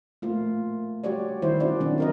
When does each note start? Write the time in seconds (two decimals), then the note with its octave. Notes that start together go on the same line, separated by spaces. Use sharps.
0.22 A3 A#3 F4
1.04 G3 F#4 G4 C#5 D5
1.42 D#3 G3 E4 C5
1.60 C#4 F#4 D5
1.80 D#3 F#3 C4 D4
1.98 F#4 A#4 D#5